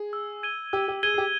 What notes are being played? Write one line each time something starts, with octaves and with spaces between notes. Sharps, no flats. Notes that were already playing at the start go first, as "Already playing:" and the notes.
Already playing: G#4
E6
G#6 D#7 G7
G4 E6
G4
G#4 G#6 D#7 G7
G#4
G4